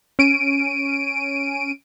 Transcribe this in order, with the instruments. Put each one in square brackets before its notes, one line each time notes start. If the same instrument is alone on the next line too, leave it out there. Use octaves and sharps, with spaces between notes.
[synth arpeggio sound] C#4 D7 D#7